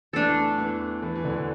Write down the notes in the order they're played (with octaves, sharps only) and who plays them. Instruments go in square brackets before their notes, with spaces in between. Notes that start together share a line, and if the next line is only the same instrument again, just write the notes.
[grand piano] E2 E3 [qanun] A3 D4 A4
[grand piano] E2 E3
E2 E3
E3
D2 D3